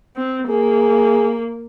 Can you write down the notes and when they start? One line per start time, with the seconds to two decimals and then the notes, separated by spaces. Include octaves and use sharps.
0.17 C4
0.48 A#3 G#4